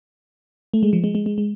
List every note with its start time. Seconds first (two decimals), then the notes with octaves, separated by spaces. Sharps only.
0.74 A3
0.83 G#3
0.93 F3
1.04 G#3
1.15 G#3
1.26 G#3
1.38 G#3